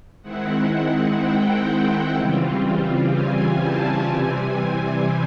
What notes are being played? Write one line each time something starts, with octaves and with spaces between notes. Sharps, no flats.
D#3 G#3 C4 E4 F#5
F#5
G5
C#3 E3 G3 C4 F4
G#5
A5
C3 E3 G3 C4 G#5